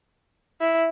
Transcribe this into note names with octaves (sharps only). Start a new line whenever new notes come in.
E4